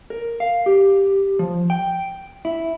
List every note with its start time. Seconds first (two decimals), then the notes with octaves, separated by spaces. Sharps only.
0.10 A#4
0.40 F5
0.66 G4
1.39 F3
1.70 G5
2.45 E4